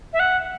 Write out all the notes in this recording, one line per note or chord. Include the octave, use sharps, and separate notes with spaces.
E5
F#5